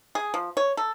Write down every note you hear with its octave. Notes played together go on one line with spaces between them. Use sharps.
G#4
F3
C#5
A4